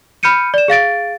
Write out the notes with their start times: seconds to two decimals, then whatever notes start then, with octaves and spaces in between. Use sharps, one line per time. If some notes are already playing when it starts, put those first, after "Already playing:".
0.23 B5 F6 G6 C#7 D#7
0.54 D5 E7
0.68 G#4 F5 A6 D7